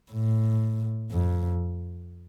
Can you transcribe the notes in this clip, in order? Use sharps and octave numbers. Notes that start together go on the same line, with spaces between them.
A2
F2